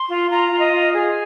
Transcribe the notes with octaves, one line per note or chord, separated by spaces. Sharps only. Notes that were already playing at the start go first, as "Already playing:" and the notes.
Already playing: C6
F4
F4 A#5
F4
D#5
F4
G#4